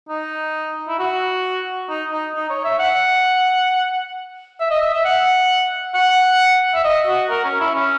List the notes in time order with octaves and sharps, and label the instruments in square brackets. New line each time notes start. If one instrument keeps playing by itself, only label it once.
[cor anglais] D#4
E4
F#4
D#4
D#4
D#4
C#5
E5
F#5
E5
D#5
E5
E5
F#5
F#5
E5
D#5
F#4
A#4
C#4
E4
C#4